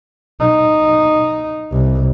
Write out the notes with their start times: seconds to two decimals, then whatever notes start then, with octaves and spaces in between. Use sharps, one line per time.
0.40 D#4
1.72 C2